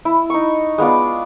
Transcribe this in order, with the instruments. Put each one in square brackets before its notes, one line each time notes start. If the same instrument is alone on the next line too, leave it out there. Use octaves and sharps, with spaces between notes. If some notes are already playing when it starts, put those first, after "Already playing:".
[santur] E4
D#4 C#6
G#3 B3 F4 D5